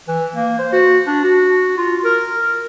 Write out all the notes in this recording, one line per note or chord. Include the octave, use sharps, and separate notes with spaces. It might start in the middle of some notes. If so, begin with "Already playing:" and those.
E3
A#3
C5
F#4
D4
F#4
F4
A#4